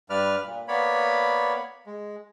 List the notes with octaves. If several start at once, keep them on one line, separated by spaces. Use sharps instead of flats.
G2 B4 D5 F6
A#2
A#3 B3 C#5 D5 B5
G#3